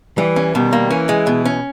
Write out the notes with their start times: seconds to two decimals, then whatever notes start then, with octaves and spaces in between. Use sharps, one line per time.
0.18 E3 G3
0.36 C#4
0.54 B2 D#3 G3
0.73 A#3
0.90 E3 C#4
1.09 G#3
1.27 B2
1.45 C#4